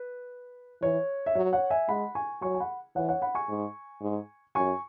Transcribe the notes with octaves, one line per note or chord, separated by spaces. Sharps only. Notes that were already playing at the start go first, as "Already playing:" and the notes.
Already playing: B4
E3 C#5
E5
F#3 C#5
C#5 F#5
E5 G#5
G#3 F#5 B5
G#5 C#6
F#3 G#5 C#6
G#5
F#5 B5
E3 C#5 F#5
C#5 F#5
F#5 B5
G#5 C#6
G#2
G#2
F#2 G#5 C#6